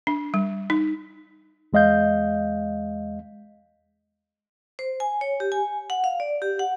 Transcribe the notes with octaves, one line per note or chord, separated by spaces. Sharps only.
D4
G3
D#4
E2 G#3 D#5 F5 G6
C5
G#5
C#5
G4
G#5
F#5
F5
D5
G4
F#5